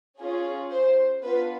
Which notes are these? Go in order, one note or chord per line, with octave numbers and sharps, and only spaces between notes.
C#4 F4 G#4
C5
B3 D4 F4 B4